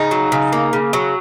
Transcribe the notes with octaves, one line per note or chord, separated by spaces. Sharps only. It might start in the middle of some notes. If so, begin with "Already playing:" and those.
Already playing: C#3 D#4
F#3
C#3
A#3
C#3
F#3